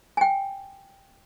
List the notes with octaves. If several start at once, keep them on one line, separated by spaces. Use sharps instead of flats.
G5 G#5